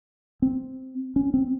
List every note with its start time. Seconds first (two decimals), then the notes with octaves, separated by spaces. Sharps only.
0.42 C4
1.16 C#4
1.34 C4